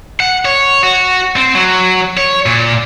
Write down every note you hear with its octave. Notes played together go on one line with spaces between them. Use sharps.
F#5
C#5
F#4
C4
F#3
C#5
A#2